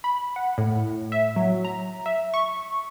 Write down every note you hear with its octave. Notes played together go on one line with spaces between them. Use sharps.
B5
F#5
A2
E5
F#3
A#5
E5
C#6